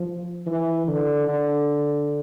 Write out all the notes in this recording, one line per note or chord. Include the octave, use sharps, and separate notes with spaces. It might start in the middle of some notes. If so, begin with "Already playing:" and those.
Already playing: F3
E3
D3
D3